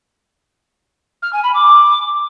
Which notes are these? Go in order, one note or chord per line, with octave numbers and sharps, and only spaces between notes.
F6
G#5
B5
D6